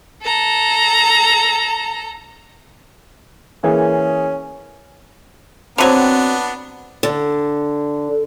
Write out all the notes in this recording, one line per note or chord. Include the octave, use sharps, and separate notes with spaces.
A4 A#5
E3 A#3 C#4 G#4
D3 F#3 B3 C4 D4 C5 D#7 F7
D3